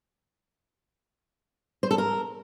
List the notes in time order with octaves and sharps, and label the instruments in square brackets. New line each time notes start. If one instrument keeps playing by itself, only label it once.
[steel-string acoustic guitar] C5
A4
A#4